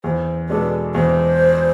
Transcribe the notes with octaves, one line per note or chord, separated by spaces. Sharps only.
E2 C5
B2 G#3 D4 A4 B4
E2 C5